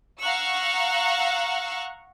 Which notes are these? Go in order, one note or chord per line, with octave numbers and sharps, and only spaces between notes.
F5 F#5 A#5 C#6 E6 F#6